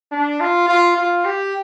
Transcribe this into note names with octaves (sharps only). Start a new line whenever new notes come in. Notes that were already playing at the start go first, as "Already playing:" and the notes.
D4
F4
F4
F4
G4